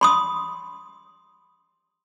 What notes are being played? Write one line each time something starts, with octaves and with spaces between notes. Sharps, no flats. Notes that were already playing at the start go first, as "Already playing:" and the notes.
B5 C6 D#6